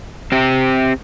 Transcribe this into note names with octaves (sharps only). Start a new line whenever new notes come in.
C4 G4